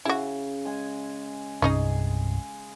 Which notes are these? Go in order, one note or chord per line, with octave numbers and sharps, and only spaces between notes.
C#3 E4 F#4
G#3 G#5
C2 G2 C3 C#4 D#4 G#4 D#5